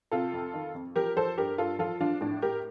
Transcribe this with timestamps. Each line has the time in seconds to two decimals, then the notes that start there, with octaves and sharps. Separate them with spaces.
0.12 C3 F4 A4
0.33 F2
0.53 D#3
0.75 F2
0.96 F3 G4 A#4
1.16 F3 A4 C5
1.37 G2 G4 A#4
1.58 G2 F4 A4
1.79 F3 F4 A4
2.00 F3 D4 F4
2.21 A2 D4
2.42 A2 G4 A#4